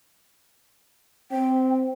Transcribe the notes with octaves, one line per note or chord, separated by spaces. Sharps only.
C4 G5